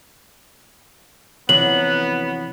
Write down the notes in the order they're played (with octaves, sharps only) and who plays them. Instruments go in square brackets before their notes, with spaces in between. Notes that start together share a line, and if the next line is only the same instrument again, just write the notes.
[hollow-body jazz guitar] F2 C3 E3 [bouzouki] F#3 [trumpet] B3 [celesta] F#7